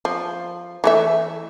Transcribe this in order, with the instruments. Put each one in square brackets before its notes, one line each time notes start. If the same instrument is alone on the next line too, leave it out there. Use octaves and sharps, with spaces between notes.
[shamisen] F3
E3 A3 E5